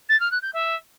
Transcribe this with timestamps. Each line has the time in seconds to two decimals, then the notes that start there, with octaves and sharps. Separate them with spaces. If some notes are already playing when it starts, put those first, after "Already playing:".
0.09 A6
0.20 F6
0.31 F#6
0.42 G6
0.53 E5